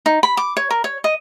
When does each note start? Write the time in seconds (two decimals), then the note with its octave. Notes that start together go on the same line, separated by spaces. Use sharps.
0.06 D#4
0.23 B5
0.37 D6
0.57 C#5
0.70 A#4
0.84 C#5
1.04 D#5